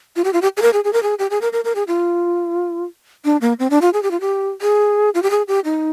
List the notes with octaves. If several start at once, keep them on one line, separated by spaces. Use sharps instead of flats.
F4
G4
F4
G4
G#4
A#4
G#4
G#4
A#4
G#4
G4
G#4
A#4
A#4
A#4
G#4
F4
D4
A#3
C4
D4
F4
G#4
G4
F4
G4
G#4
F4
G4
G#4
G4
D#4